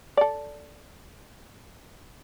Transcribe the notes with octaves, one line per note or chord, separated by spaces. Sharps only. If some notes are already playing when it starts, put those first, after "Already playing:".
A4 D5